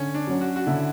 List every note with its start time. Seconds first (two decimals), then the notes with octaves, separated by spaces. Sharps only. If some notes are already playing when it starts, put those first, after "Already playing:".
Already playing: D3 C#4
0.14 D4
0.27 F#3 C#4
0.41 F#4
0.56 F#4
0.66 D3 E4